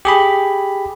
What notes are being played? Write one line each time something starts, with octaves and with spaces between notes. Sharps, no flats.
G4 G#4 B5